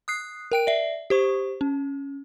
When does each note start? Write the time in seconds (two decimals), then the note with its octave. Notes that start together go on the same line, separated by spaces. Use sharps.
0.08 D#6 F#6 C7
0.52 A#4 G5 D7
0.67 D5 E5
1.10 G4 C5 C#6
1.61 C#4